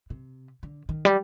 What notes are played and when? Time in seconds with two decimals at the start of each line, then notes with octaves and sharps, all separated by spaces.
0.10 C3
0.63 D3
0.89 D#3
1.05 G3